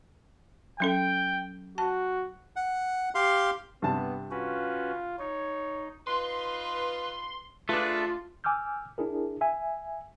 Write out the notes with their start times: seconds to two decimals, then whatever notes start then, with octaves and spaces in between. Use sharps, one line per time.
0.80 F#3 C#4 A4 G5
1.78 F#4 A5
2.56 F#5
3.15 G4 F5 C6
3.82 G2 C3 B3 A5
4.31 C#4 F4 F#4 B4
5.19 D#4 C#5
6.07 D#4 F4 B4 C6
7.69 A3 D4 F4 G#4 B4
8.44 G#5 D6 E6 F6 G6
8.98 D4 E4 G#4 A#4
9.41 E5 G#5